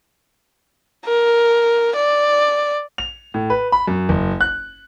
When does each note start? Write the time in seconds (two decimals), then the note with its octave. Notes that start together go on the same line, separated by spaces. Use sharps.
1.06 A#4
1.96 D5
2.98 F7
3.34 A2
3.50 B4
3.72 B5
3.87 F#2
4.09 F#1
4.41 F#6